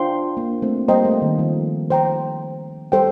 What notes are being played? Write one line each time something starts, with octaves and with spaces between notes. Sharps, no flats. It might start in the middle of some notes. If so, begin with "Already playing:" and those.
Already playing: D4 F4 C5 G5 C6
A#3 D4
A3 C4
G3 A#3 C5 D#5 G5 A#5
A3
D#3
F3
C5 G5 A#5
G3 A4 C5 G5